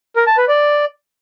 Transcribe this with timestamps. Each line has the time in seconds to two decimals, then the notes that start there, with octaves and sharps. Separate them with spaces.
0.16 A#4
0.27 A5
0.37 B4
0.48 D5